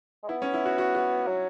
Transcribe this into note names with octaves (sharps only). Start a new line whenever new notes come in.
G#3
B3 E4
C#4
E4
F#4
F#4
F#4
F#3